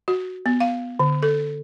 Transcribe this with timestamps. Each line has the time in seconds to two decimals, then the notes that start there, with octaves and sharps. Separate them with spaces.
0.08 F#4
0.46 B3
0.60 F5
0.99 D3
1.23 A4